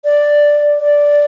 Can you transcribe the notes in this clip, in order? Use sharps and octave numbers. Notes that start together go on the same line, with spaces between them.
D5
D5